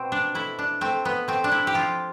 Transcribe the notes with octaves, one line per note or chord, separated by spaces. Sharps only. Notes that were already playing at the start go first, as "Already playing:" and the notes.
Already playing: B2 C4
D4
A3 E4
D4
A3 C4
B3
A3 C4
D4
E4
G4
F3 F4